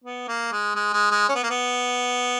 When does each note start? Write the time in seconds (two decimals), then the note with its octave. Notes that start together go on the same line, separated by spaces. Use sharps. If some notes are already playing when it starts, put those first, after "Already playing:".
0.04 B3
0.28 A#3
0.52 G#3
0.75 G#3
0.93 G#3
1.11 G#3
1.29 C#4
1.35 B3
1.43 A#3
1.50 B3